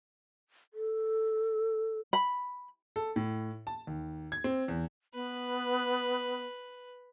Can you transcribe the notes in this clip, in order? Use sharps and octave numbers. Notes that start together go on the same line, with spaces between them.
A4
B5
A4
A2
A5
D#2
G#6
C4
E2
B3 B4